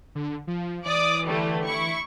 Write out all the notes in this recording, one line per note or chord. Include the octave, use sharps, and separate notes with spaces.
D3
F3
E3 D5 D6 D#6
D3 G3 A3
E4 C#6